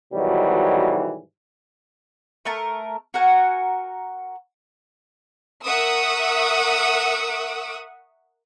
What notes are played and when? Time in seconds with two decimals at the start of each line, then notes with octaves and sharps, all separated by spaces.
0.13 G#2 B2 D#3 E3 F#3 G3
2.45 A3 A#4 A5
3.14 F#4 A#4 F#5 G#5
5.65 A#4 E5 F#5 C#6 D#6 E6